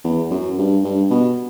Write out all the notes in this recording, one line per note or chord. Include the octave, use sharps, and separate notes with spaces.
E2
F#2
G2
G2
B2